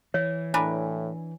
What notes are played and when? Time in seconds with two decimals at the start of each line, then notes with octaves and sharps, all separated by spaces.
0.14 E3 C#5
0.54 A2 D4 A#4 B4 G#5